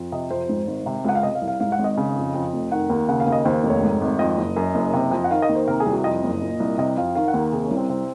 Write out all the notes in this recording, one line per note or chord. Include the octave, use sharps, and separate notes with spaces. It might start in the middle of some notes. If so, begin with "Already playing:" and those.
Already playing: F2
C3 D#5
F2 C5
G#2
G#1
C3
C#2 F#5
F5
C3 D#5
F5
C2
F5
G#2 F5
F#5
G#1
D#5
C#3
F2
F2
F1
D#3 F#5
D#2
C#3 F#5
F5
D#2
D#5
D#2 C5
F1
C#5
G#2
G#1
F2 D#5
F#1
F#2
F#1
C3
F2
F#5
D#3 F5
D#5
D#2
C5
C3 A#4
G#4
C2
F#4
F2 D#5
F#1
A#2
C2
C3 D#5
F2 F5
D#3 F5
F#5
D#2
A#4
C3 G#4
C#4
C2
C4
C3 C4